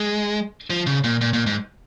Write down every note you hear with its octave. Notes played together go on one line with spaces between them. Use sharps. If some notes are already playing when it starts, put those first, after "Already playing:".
Already playing: G#3
F3
C#3
A#2
A#2
A#2
G#2